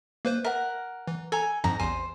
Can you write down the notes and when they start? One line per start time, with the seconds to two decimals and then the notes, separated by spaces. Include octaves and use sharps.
0.25 A#3 B4 C5
0.44 A#4 E5 F#5
1.07 E3
1.32 A4 G#5 A#5
1.64 F2 G#2 F3 A#5
1.80 A1 E2 C5 G#5